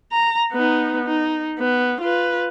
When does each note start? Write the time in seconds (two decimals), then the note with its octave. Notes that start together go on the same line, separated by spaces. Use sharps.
0.12 A#5
0.53 B3 D#4
1.05 D#4
1.59 B3
2.01 F4 B4